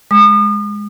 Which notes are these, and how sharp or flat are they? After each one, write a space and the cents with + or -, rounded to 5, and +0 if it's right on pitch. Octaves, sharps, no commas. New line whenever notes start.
G#3 +0 D#6 -40